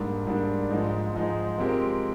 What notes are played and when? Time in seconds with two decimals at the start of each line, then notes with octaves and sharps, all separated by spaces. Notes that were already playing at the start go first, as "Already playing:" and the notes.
Already playing: G#2 G3 A#3 D4
0.27 G#2 G3 A#3 D4
0.70 G#2 F3 G#3 D#4
1.14 G#2 F3 G#3 D#4
1.57 F3 G#3 C4 G4 A#4